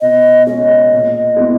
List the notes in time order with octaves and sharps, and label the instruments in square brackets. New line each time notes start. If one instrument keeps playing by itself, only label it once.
[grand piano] B2 [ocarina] D#5
[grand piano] G#3 C#4 [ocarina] D#5
[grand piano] A#2
G#3 B3 E4